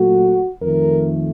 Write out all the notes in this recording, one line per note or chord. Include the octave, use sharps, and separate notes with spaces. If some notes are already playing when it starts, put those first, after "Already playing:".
Already playing: A#2 F#3 A3 F#4
F2 D#3 A3 A#4